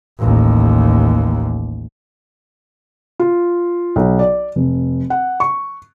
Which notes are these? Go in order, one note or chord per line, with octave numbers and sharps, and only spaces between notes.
A1 D#2
F4
B1
D5
F1
F#5
C#6